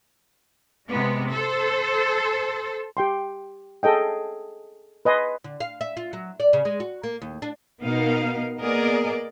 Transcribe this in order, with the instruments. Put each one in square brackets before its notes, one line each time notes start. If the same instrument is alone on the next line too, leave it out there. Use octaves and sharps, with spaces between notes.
[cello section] C3 G#3 B3
A4 C5
[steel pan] G4 G5 C6
G#4 A4 D#5 G5
B4 D#5 G#5 C6
[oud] D3
F5
E5
F4
F#3
D5
C#3
G#3
F#4
A#3
D#2
D4
[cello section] B2 B3 D#4 A#4 F5
A#3 B3 G#4 A#4 D5 D#5